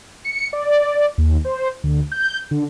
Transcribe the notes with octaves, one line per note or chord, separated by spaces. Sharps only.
C#7
D5
D#2
C5
D2
G6
D3